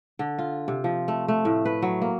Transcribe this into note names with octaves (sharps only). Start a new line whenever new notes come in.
D3
F4
C3
F3
A3
A3
A2
B4
F#3
A#3